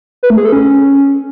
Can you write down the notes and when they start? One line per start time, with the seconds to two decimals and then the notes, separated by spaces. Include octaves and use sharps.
0.23 B4
0.30 A3
0.38 G#4
0.45 A4
0.52 C#4